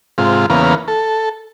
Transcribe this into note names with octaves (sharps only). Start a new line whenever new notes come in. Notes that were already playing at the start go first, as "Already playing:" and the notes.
G#2 C3 F4
E2 C#3 A#3 B3 F5
A4